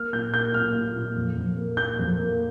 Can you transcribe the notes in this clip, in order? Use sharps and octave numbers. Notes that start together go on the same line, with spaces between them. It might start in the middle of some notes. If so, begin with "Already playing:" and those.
Already playing: A#3 F6
A#2 G6
A#3 G6
A#2 F6
A#2
A#2
F2
F2
A#3
A#3 G6
F2
A#3